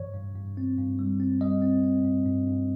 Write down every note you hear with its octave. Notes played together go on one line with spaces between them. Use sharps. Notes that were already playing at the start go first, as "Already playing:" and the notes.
Already playing: G2 E3 C#5
G2
G2
C4
G2
G3
C4
G3 D#5
C4
C4
G2
G2
G2